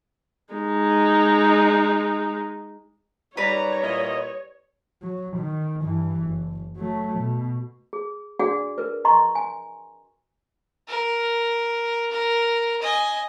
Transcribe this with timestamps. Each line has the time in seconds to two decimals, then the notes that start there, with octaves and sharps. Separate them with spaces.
0.54 G#3 D#4
3.37 F#2 G3 D#4 B4 C#5 D5 A#5
3.82 A#2 E4 D#5
5.02 F#3
5.37 D#3
5.82 G2 E3
6.22 F#1
6.77 F#3 A3
7.19 B2
7.93 G#4
8.39 D4 F#4 G#4 D5 F#5
8.78 A#4 B4
9.05 D#5 A#5 C6 C#6
9.35 G#5
10.88 A#4
12.12 A#4
12.82 D#5 G#5